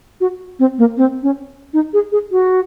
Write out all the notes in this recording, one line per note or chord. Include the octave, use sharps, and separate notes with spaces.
F#4
C4
A#3
C4
C#4
D#4
G#4
G#4
F#4